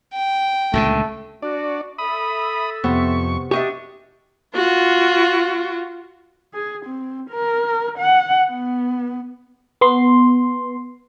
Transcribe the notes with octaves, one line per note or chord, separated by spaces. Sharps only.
G5
C#2 A#2 D3 A3
D4 F#4 D5
A4 E5 B5 D#6
F2 C3 B3 C#6
D4 G4 D#5 E5 C#6
F4 F#4
G#4
C4
A#4
F#5
B3
B3 C6